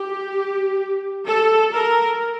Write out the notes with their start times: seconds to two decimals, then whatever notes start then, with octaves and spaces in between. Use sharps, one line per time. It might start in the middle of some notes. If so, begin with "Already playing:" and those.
Already playing: G4
1.27 A4
1.73 A#4